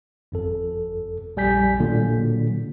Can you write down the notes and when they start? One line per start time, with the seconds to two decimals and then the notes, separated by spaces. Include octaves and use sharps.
0.32 G1 F2 A4
1.37 A#1 G3 G#5 G6 B6
1.80 A#2 D3 F#3 A#3